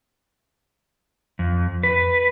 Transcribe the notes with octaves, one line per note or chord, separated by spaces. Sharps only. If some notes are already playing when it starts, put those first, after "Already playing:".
F2
B4